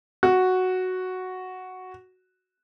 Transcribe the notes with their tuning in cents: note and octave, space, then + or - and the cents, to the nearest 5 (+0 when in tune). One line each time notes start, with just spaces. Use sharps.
F#4 +0